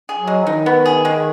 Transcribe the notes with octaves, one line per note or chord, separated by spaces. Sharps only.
G#4
F#3
G#3
D#3 D#4
B3
G#4
G#3